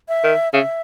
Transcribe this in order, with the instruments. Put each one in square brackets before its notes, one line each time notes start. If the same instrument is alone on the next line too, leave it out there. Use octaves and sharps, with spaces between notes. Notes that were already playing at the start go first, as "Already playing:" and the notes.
[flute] E5
[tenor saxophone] D#3
[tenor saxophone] C#3 [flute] E5